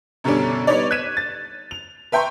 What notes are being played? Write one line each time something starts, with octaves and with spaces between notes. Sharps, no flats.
F#2 B2 D3 G3 C#4 D4
G3 B3 D#4 C#5 D5
F#6 G#6 B6 D#7 E7
A6
F7
B4 E5 G5 A#5 C6 C#6